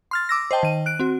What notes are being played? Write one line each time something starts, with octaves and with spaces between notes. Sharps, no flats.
C6 F6 A6
D6 E6 A#6
C5 D#5 G5 A5
D#3 D#7
F#6 D7
C4 F#4